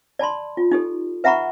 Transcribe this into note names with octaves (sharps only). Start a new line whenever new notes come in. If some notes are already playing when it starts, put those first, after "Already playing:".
D5 A5 B5 C6
F4
D#4 G4 A4
B4 E5 F#5 A#5 B5 C#6